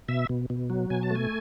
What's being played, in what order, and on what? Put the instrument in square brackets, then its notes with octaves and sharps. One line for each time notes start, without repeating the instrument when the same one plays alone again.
[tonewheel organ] B2 E5
B2
B2
F#3
B2 G#5
A5
A3 G#5